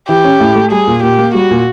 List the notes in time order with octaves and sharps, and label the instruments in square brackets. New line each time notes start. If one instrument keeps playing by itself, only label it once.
[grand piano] E3 [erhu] G4
[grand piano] C#4
A2
A3
[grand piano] G3 [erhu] G#4
[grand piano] A#2
[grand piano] A#2 [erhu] G4
[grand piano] A#3
[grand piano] G3 [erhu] F#4
[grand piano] A#2